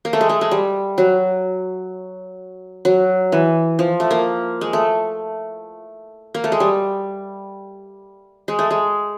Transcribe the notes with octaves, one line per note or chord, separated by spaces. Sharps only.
A#3
A3
G#3
A3
G#3
G3
F#3
F#3
E3
F3
A3
A#3
G#3
A3
A#3
A3
G#3
G3
G#3
A3
G#3